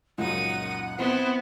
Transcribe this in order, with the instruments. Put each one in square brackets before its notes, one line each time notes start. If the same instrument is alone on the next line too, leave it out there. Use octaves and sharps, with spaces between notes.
[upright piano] C#2 F#2 A#2 [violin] D#4 D#7 [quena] F#5
[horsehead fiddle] B3 [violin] C4 E4